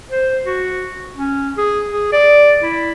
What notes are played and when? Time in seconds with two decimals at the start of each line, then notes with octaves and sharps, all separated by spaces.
0.11 C5
0.46 F#4
1.16 C#4
1.57 G#4
1.89 G#4
2.12 D5
2.62 E4